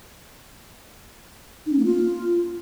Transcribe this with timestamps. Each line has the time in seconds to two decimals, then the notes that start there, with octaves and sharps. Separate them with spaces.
1.66 D#4
1.72 C#4
1.79 A#3
1.85 F4